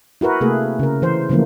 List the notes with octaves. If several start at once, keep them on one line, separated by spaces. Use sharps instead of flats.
E4 F#4 A#4 B4
C3 A3 A#3 G#4
C#3 A#4
E3 C5
C#3 E3 F3 A3 A#3